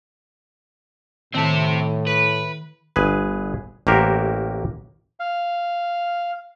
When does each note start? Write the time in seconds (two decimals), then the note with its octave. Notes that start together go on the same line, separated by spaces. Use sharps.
1.34 A2 D#3 C4 E5 A5
2.07 B4
2.96 G1 G#4 B4
3.87 A1 A#3 F#4 G4 A#4 C5
5.20 F5